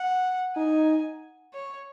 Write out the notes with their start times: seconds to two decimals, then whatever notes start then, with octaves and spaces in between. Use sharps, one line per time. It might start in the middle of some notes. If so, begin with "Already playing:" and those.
Already playing: F#5
0.56 D#4 G#5
1.53 C#5